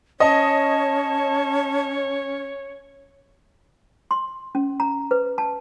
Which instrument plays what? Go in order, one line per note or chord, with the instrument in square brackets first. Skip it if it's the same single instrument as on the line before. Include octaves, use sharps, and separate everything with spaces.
[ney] C#4 [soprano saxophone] C#5 [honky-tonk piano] D#5 [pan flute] A5
[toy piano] C6
C#4
A#5
B4
A5